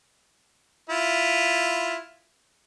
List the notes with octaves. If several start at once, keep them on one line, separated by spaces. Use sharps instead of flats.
E4 F4